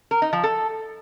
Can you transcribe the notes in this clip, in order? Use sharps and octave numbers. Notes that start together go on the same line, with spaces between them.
A#4
D#4
F3
A4